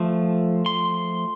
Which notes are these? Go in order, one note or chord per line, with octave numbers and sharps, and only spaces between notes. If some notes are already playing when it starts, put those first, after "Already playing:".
Already playing: F3 A3
C6